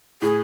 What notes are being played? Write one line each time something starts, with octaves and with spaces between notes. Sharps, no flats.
A2 G#4